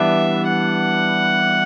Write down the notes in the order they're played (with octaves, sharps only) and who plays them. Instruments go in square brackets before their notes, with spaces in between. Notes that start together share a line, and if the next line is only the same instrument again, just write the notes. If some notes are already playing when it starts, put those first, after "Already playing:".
Already playing: [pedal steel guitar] E3 G3 B3 D4 [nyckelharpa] E5
[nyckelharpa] F#5